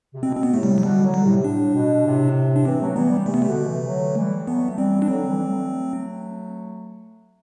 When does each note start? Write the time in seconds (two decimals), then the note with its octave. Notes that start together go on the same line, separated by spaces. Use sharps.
0.14 C3
0.23 B2 C4
0.37 C4
0.43 B3
0.53 A2 C3 A3
0.63 G3
0.78 F#3
0.83 B2 D3 G3
1.04 D3 F#3
1.14 G3
1.24 A2 C3
1.44 A2 D4
1.74 B2
2.05 A2 C3
2.56 D4
2.65 C3 E3 C4
2.80 F#3 A3
2.95 E3 G3 B3
3.10 E3 G3
3.26 C3 E3 A3
3.34 B3
3.42 B2 D3 A3
3.67 C3 E3
3.87 D3 F#3
4.17 E3 G3
4.47 F#3 A3 B3
4.77 E3 G3 C4
5.02 D4
5.08 D3 F#3 C4
5.29 E3 G3
5.41 G3
5.48 F#3 A3